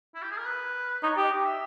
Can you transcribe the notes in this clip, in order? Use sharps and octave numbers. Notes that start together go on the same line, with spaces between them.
E4
G4
G#4
A#4
B4
D#4 C#5
G4 D#5
D#5
E5